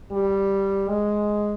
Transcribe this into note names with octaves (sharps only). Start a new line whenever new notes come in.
G3
G#3